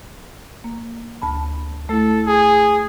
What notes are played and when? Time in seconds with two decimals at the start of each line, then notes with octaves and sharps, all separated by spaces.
0.64 A#3
1.22 D2 A5 B5
1.89 A3 E4 A4
2.27 G#4